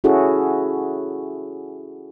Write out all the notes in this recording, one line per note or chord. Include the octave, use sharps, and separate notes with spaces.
C#4 E4 F#4 G#4 A4